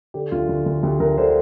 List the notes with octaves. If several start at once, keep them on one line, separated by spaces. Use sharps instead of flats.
D3 G4
D2 F4
D2
D2
D2 G4
D2 A#4
D3 C5